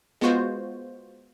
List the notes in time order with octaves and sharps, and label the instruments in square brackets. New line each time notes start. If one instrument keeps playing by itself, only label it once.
[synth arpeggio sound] G#3 B3 F4 F#4 C5